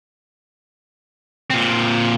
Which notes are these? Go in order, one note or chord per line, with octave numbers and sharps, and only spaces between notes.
A#2 C4